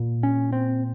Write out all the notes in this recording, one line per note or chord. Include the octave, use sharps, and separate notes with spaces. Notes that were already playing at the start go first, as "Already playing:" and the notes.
Already playing: A#2
C#4
C4